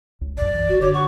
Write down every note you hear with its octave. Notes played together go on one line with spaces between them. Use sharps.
C#2
A#1 F#2 D5
E3
F#1 F#4
D3 C#5 D6
F#5 C#6